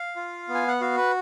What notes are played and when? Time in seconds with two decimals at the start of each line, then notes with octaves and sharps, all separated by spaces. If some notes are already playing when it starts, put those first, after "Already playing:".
Already playing: F5
0.16 F4
0.49 B3
0.55 G#5
0.68 F#5
0.81 F#4 F5
0.97 B4